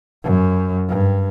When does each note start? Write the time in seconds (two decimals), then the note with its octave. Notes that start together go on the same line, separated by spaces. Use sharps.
0.24 F#2
0.89 G2